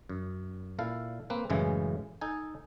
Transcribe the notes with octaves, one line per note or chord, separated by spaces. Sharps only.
F#2
A#2 E4 A4 F5
A#3 C4 B4
F#2 A2 C#3 E3 G#3
D#4 A4 G#5